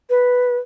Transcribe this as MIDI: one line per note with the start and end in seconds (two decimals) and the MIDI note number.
0.10 0.57 71